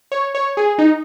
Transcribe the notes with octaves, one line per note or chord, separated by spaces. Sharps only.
C#5
C#5
G#4
D#4